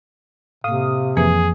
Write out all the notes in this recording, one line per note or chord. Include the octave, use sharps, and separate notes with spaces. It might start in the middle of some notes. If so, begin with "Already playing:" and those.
A2 C3 A#3 F5 D#6
F2 E3 A#3 G#4 B4